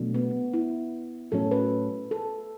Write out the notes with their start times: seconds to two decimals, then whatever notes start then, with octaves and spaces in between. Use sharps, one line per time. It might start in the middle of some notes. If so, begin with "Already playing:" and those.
Already playing: B2 F#3 A3 D4
0.14 B3
0.54 E4
1.32 A2 F#3 C#4 A4
1.51 B4
2.11 A4